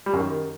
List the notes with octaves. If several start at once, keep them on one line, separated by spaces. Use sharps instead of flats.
G3
F#2
D#3